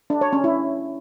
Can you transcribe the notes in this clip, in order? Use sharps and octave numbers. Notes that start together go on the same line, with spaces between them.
D4
C#5
C#4
E4